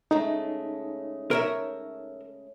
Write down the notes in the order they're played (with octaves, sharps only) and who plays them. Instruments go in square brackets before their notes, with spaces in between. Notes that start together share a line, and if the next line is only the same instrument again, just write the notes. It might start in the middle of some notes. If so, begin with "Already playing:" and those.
[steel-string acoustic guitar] C#3 G#3 A3 [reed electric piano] D#4
[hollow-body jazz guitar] A#4 C#5 E5